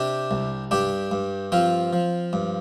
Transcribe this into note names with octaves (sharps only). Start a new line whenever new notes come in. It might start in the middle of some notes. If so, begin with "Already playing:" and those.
Already playing: C3 D4 G4
C2
G2 D4 G4
G2
F3 C4 F4
F3
G2